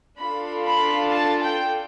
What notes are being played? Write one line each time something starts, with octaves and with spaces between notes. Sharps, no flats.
D4 F4 A4 B5
B5
A5
G5